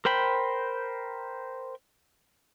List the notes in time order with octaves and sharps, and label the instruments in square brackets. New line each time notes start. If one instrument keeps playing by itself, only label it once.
[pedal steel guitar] A#4 C5 G5 B5